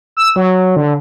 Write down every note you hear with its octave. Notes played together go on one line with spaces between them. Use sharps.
E6
F#3
D3